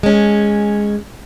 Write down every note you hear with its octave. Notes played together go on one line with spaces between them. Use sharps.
G#3 C#4